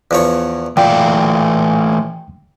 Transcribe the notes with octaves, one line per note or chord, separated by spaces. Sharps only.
E2 F3 C#5
A#2 E3 A3 F5 G5